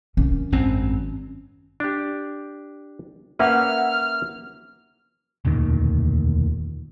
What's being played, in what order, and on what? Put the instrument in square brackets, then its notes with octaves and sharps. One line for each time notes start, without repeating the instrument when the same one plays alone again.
[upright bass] D#3 C#4
[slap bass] G#1 F#2 C4
[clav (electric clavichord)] D4 G4
[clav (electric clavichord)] A#3 C#4 B4 [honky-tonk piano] E5 F#5 [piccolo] F6
[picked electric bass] E1 D2 A#2 D#3